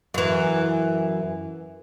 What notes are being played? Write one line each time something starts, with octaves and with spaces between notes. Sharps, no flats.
F#2 E3